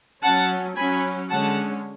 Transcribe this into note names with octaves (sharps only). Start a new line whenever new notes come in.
F#3 C#4 F#5 A5
F#3 C#4 G#5 B5
D3 G#3 C#4 F#5 A5